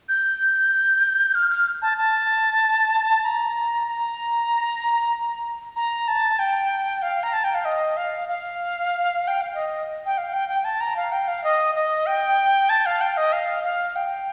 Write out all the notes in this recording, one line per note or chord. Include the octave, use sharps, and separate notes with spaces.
G6
F6
F6
A5
A5
A#5
A#5
A#5
A5
G5
F5
A#5
A5
G5
F5
D#5
F5
F5
G5
F5
D#5
G5
F5
G5
G5
A5
A#5
F5
G5
F5
D#5
D#5
G5
A5
F5
G5
D#5
F5
F5
G5